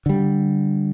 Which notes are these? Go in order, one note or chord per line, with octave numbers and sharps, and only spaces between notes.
D3 G3